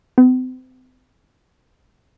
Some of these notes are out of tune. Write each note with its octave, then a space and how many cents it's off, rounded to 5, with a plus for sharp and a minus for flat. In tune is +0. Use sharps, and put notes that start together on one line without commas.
C4 -40